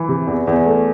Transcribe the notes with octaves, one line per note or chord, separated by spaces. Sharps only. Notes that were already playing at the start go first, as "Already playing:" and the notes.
Already playing: E3
C3
E2
E2
A3